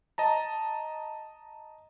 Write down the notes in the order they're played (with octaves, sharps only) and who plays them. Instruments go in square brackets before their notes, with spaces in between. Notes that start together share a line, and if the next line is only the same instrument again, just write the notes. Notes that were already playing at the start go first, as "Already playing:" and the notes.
[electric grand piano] D#5 A5 A#5